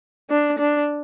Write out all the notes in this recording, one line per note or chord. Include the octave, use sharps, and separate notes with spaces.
D4
D4